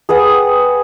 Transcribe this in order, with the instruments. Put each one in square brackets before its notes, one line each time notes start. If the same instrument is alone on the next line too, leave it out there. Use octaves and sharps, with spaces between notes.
[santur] G#4 B4 F#5 G5